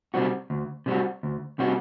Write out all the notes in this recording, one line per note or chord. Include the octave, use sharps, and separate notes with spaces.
C3 G3 C4 F#4
D2
C3 G3 C4 F#4
D2
C3 G3 C4 F#4